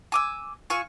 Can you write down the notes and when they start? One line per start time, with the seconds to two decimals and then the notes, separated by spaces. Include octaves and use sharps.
0.12 G#5 D6 E6
0.70 F4 G#5 C#6 E6